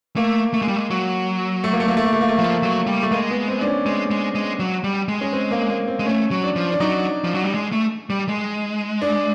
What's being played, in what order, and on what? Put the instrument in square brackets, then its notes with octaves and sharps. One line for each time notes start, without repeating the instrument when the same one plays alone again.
[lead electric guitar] A3 [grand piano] A#3
[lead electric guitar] A3
G#3
G3
G#3
F#3
[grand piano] A3
A#3
A3
A#3
A3
A#3
A3
A#3
A3
[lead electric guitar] F3 [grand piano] A#3
[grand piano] A3
[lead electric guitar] F#3
G3
[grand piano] A3
[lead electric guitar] G#3 [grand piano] A#3
[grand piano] B3
C4
D4
C#4
[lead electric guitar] G#3 [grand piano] C4
[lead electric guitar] G#3
G#3
F#3
G3
G#3
[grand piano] C#4
C4
A#3
A#3
C4
[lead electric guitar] G#3
[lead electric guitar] A3 [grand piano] C#4
[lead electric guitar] F#3
[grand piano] D4
[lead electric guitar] F3
[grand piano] D4
[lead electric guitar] F#3 [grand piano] D#4
[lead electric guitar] F3
F#3
G3
G#3
A3
G3
G#3
[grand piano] D4